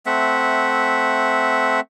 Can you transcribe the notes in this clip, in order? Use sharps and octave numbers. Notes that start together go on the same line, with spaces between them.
A3 C4 E5 F#5